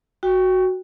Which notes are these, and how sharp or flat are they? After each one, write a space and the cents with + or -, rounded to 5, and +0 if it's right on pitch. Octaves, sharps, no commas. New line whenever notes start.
F#4 +0 G5 +15